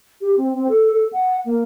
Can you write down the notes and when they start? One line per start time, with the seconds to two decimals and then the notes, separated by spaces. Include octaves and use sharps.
0.21 G4
0.37 C4
0.53 C4
0.69 A4
0.91 A4
1.13 F#5
1.46 A#3